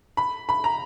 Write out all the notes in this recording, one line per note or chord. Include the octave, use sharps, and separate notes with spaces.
B5
B5
A#5